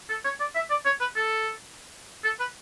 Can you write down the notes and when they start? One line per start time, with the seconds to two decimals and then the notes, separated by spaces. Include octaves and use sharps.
0.10 A4
0.25 C#5
0.40 D5
0.55 E5
0.70 D5
0.85 C#5
1.01 B4
1.16 A4
2.24 A4
2.40 B4